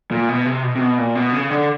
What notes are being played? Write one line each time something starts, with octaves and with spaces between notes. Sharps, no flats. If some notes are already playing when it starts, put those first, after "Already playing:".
A#2
B2
C3
B2
C3
B2
A#2
B2
C#3
D3